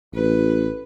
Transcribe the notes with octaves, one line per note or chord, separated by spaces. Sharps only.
A1 B4